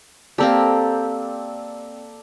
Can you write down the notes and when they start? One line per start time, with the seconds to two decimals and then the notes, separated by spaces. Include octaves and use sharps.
0.38 A#3 C4 G4 A4 D5 A#5